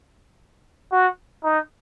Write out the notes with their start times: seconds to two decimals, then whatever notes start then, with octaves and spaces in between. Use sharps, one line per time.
0.92 F#4
1.44 D#4